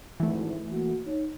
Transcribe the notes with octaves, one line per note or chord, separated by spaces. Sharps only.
G#1 D2 E3 A3
A#3 F#4
D#4 C#5